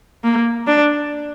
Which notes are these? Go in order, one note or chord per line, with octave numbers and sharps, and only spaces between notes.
A#3
D4